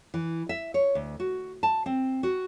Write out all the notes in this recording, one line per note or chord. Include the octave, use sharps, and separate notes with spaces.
E3
E5
C#5
D2
F#4
A5
C4
F#4